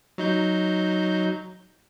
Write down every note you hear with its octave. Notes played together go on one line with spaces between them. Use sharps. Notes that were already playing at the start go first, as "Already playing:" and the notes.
F#3 D#4 G6